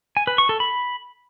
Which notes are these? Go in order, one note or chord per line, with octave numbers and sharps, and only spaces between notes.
G#5
B4
C#6
A4
B5